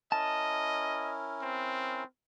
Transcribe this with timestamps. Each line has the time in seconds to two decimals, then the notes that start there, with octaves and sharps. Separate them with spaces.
0.12 C#4 E4 A#4 D#5 A5
1.42 C4